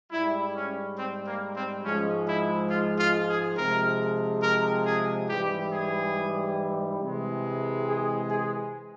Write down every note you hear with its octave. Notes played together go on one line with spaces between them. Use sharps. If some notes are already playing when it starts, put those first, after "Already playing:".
G#2 G3 E4
C#4
C4
A#3
C4
G#2 F3 G#3 C#4
E4
F4
F4
G#4
C3 F3 G#3 A#4
A#4
G#4
G#2 E3 G3 G4
G#4
C3 E3 G#3
G#4
G#4